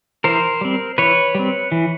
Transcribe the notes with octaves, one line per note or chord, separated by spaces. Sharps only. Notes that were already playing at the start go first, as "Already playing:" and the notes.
E3 A#4 C5
G3 C4
E3 B4 C#5
G3 C4
E3